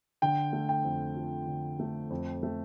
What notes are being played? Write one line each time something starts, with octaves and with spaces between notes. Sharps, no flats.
D3 G5
A3
G5
F2
F3
D3
A3
F2
A3